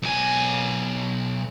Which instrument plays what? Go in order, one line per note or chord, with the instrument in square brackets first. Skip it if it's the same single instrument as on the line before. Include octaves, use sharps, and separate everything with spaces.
[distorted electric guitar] B1 G#5